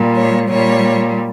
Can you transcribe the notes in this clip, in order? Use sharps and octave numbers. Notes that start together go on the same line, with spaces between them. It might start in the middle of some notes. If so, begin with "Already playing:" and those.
Already playing: A#2 G3
C#5
A#2 G3 C#5